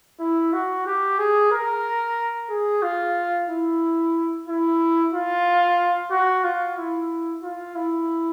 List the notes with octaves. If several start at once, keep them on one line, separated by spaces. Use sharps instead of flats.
E4
F#4
G4
G#4
A#4
G#4
F4
E4
E4
F4
F#4
F4
E4
F4
E4